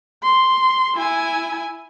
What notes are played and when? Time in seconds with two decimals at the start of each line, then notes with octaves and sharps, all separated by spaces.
0.23 C6
0.95 E4 G#5